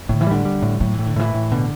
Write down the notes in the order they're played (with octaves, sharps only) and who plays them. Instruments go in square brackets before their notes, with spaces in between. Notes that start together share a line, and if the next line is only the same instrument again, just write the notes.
[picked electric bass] A2 [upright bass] D3
[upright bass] E3
[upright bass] D3 [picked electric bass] G3
[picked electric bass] G3
A2
[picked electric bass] A2 [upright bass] F#3
[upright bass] E3
[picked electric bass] A2
[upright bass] D3
[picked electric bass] A2 [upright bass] E3
[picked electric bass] A2
[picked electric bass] B2 [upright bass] D3